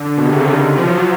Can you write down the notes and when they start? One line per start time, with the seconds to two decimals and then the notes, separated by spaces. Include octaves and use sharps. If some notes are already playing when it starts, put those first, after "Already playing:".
Already playing: D3
0.17 B2
0.25 C3
0.33 C#3
0.40 D3
0.47 D#3
0.78 F3
0.87 F#3
0.98 F3